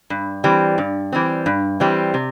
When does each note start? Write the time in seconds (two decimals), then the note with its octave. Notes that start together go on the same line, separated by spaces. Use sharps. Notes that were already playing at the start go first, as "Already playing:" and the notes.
0.10 G2
0.44 E3 G3 C4
0.78 G2
1.12 E3 G3 C4
1.46 G2
1.80 E3 G3 C4
2.14 C3